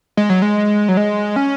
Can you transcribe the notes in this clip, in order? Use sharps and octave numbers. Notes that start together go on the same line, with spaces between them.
G#3
F#3
G#3
F#3
G#3
C#4